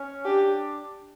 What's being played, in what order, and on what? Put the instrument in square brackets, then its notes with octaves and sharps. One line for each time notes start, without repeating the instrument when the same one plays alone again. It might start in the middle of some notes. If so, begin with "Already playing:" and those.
Already playing: [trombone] C#4
[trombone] D4 [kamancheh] G4